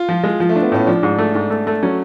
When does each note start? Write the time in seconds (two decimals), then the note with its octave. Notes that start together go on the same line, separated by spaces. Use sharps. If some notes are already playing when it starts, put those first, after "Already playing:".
Already playing: F4
0.09 F3
0.24 G#3
0.40 F3
0.49 A3
0.56 D4
0.62 B3
0.72 A2 C#4
0.87 F3 D4
1.03 G#2
1.18 A3
1.35 G#2
1.50 A3
1.67 A3
1.83 F#3 C#4